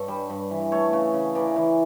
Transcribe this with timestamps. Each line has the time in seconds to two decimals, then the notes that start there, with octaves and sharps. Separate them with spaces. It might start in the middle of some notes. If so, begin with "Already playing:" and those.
Already playing: G2 A4 C#5
0.08 G3
0.30 G2
0.51 E3
0.72 A3 A4 C#5
0.93 C#3
1.14 C#3
1.35 E3 A#4 D5
1.56 E3